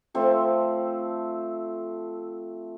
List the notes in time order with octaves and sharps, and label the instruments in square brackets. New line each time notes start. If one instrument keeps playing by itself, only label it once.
[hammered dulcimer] F3 A3 C4 A4